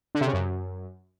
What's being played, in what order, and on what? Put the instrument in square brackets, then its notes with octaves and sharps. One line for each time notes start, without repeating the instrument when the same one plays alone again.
[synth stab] D3
C3
C#3
F#2